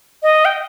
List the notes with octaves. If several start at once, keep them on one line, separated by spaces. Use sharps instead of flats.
D#5
G5